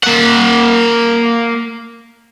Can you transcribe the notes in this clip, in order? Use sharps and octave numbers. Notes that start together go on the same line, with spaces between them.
A#3 F#5